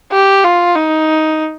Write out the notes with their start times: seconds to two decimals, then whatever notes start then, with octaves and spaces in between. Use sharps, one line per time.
0.12 G4
0.44 F4
0.75 D#4